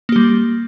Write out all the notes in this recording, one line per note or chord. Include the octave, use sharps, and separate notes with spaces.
G3 A#3 G4